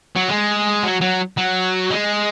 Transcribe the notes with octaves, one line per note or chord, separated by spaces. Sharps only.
F#3
G#3
F#3
F#3
F#3
G#3